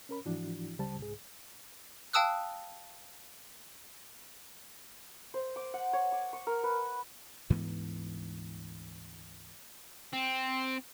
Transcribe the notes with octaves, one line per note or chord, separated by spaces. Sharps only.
C#4 A#4 B5
G#2 E3 F3 D4 E4 F#4
C#2 C#3 G3 G4 C5 A5
C2 G#2 G#4
F5 G5 A5 D#6 E6 F#6
C5
D6
F#5
C#5
D6
C#6
A#4
B4
D2 G#2 E3 B3
C4